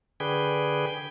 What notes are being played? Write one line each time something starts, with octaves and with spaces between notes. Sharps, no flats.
D3 G#4 B4 G5